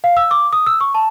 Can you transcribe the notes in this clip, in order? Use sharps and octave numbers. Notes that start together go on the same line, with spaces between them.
F5
E6
D6
D#6
E6
C#6
A5